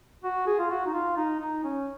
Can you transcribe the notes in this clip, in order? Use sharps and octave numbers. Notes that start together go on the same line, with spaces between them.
F#4
G#4
F4
F#4
D#4
F4
D#4
D#4
C#4